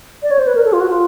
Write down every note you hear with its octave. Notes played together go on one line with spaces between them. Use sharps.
D5
C#5
C5
B4
A#4
A4
F4
F#4
F4